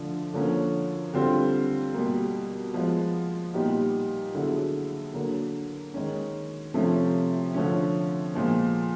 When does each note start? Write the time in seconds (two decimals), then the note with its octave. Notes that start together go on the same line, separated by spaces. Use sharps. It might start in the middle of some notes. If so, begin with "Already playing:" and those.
Already playing: D3 F3 A3 D4
0.34 D3 F3 A#3 C#4
1.14 D3 G3 C4 F4
1.94 B2 G3 A#3
2.74 F3 G#3 B3
3.54 A#2 G3 B3 D#4 G4
4.35 D3 F#3 B3 E4 G#4
5.14 D3 F#3 A#3
5.94 D#3 G#3 C#4
6.74 C3 F3 A3 C#4
7.54 D3 F3 A3 C#4
8.34 A#2 F3 G#3 B3